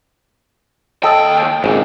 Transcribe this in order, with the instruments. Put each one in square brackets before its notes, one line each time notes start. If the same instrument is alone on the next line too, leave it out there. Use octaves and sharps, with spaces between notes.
[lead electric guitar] D#2 G5 [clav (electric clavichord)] A4 D#5
[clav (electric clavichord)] G#1 [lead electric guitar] G#2 C#3